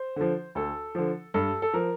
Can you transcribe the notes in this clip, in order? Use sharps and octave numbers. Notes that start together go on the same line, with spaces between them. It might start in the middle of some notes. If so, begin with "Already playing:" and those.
Already playing: C5
D3 F3
D2 A4
D3 F3
G2 A4
A4
F3 A#4